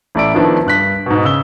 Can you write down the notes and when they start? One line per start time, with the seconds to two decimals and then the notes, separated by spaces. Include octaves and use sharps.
0.15 A1 A3 D5 E5 D7
0.34 D#3 F3 A3 B3 D4 E4
0.66 G2 F#6 B6
1.06 G#2 B2
1.24 C#3 E6 G7